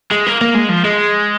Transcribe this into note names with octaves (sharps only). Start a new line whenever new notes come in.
G#3
A#3
A#3
G#3
F3
G#3